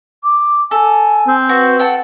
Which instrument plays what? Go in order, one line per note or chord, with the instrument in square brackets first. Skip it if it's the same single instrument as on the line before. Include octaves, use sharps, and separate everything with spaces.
[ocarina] D6
[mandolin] A4 [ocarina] G#5
[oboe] C4
[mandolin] F#4 [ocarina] B4
[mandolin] A4 F#5 G5